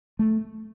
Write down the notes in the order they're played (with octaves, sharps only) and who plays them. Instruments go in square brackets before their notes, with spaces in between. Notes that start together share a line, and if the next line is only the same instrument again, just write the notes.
[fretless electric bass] A3